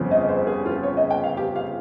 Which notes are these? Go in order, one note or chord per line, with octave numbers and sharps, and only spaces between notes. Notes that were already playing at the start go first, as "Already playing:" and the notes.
Already playing: G1 F2 C#3 F3 C4
D#5
C5
G#4
F4
C#5
D#5
G5
F5
G4
F5